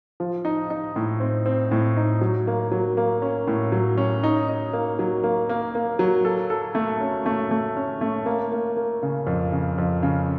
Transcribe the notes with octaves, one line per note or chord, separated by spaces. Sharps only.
F3
D#4
D#4
A2
C4
C4
A2
D#4
F#3
A#3
F#3
A#3
C#4
A2
F#3
C#4
D#4
D#4
A#3
F#3
A#3
A#3
A#3
F#3
A4
A4
A3
C#4
A3
A3
C#4
A3
A#3
A#3
A#3
C#3
F2
C#3
F2
C#3